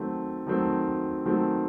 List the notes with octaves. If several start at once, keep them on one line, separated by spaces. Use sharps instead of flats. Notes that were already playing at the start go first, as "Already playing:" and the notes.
Already playing: D#3 F#3 A3 C4
D#3 F#3 A3 C4
D#3 F#3 A3 C4